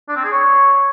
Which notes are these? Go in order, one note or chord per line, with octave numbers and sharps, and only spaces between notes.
D4
C4
G#4
C#5